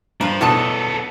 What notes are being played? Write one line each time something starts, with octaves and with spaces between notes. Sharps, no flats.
G2 F3 A#4 B4 F5
E2 B2 F#3 B3 D4 A4 D#5 A5